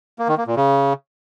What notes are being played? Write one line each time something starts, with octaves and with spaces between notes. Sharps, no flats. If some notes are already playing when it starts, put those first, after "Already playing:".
A#3
D#3
A#3
A#2
C#3